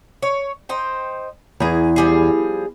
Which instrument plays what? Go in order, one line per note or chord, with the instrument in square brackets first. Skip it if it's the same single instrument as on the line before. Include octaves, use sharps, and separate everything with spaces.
[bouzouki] C#5
D#4 C5 G5
[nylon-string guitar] E2 [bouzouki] G#4 A#5
[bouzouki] F3 G3 G#4